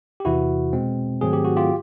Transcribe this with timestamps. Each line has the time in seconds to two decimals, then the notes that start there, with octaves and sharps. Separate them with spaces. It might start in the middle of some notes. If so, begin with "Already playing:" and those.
0.20 G4
0.25 E2 C3 E3 E4 F#4
0.73 B2 G#3 C4
1.21 G#2 D#3 F#3 A3 C4 G#4
1.33 G4
1.45 F#4
1.57 F4 G4